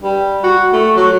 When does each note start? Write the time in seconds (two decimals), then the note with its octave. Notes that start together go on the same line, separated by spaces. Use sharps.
0.03 G3
0.44 F#4
0.73 A3
0.97 F#3